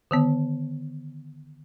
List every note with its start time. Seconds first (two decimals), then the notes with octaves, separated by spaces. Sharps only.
0.11 D3 D#3 B3